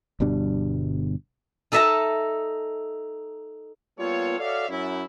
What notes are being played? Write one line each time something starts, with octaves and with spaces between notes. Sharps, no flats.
G1 B2 G3 D4
D#4 A4 D#5 E5 A5 A#5
G3 A#3 B3 F4 A4 C#5
F#4 A4 C#5 D5 E5 F5
F#2 C#4 E4